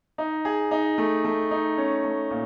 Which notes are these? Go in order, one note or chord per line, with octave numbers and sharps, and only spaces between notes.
D#4
G#4
D#4
A3
A3
D#4
C#4
A3
A#2